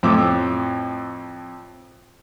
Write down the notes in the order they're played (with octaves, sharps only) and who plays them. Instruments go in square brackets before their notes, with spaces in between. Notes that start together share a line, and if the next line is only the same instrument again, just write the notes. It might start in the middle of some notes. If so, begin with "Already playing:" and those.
[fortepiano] F2 A2 D6 E6